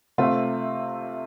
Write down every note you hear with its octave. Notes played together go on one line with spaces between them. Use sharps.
C3 A3 C4 F4